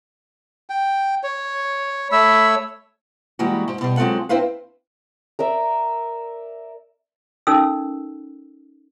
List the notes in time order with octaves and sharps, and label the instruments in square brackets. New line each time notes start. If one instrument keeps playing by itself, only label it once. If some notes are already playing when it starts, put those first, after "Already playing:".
[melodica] G5
C#5
[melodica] A3 C#5 E6 [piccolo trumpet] B5
[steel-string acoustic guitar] E3 G3 G#3 A#3 E4 F#4
G#2
B2 G3
F#3 G#3 C4 F4 A4 F#5
C4 D4 E4 B4 C5 F5
[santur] A#4 D5 E5
[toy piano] C#4 D#4 A4 A#4 E6